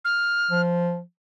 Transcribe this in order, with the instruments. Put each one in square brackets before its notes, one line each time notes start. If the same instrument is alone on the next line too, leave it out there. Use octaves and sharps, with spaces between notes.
[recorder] F6
[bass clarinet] F3